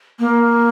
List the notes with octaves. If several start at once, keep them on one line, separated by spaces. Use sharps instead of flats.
A#3